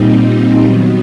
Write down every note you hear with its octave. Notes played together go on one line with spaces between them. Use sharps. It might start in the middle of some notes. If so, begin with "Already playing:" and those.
Already playing: A#2 G3 C4 D#4
D#3 F#3 B3